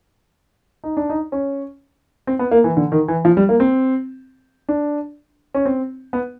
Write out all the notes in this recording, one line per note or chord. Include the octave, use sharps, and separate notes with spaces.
D#4
D4
D#4
C#4
C4
B3
A#3
E3
D3
D#3
E3
F3
G3
A#3
C4
D4
C#4
C4
B3